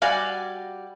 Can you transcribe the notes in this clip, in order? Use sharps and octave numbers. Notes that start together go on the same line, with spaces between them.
G3 F#4 D5 F5 G#5